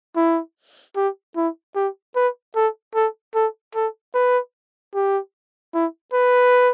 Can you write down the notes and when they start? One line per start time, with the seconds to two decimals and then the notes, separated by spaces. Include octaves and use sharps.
0.16 E4
0.96 G4
1.36 E4
1.75 G4
2.16 B4
2.55 A4
2.95 A4
3.34 A4
3.75 A4
4.14 B4
4.94 G4
5.74 E4
6.13 B4